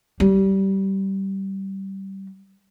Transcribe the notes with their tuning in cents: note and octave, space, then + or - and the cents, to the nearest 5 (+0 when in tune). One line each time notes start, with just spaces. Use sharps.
G3 -20